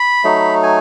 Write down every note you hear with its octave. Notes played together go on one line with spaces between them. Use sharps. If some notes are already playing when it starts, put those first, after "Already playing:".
Already playing: B5
F#3 A3 D#4
G#5